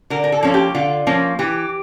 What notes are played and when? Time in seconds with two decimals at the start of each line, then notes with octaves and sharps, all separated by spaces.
0.10 D3 A#4
0.24 A#4
0.32 A4
0.43 F3 A#3 C#4
0.54 G4
0.75 D3 F4
1.07 F3 A#3 C#4
1.39 E3 G4